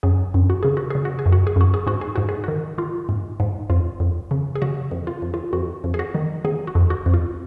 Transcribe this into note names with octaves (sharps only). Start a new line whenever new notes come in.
F#2 G#4
F#2
F#4
C#3 G#4
F#4
C#3 G#4
F#4
G#4
F#2
F#4
G#4
F#2 F#4
G#4
G#2 F#4
G#4
G#2 F#4
G#4
D#3 F#4
D#3 F4
G#2
G#2
F2 F4
F2
C#3
G#4
C#3 F#4
F2
F4
F2
F4
F2 F#4
F2
G#4
F#4
D#3
D#3 G#4
F#4
F2
F#4
F2
F4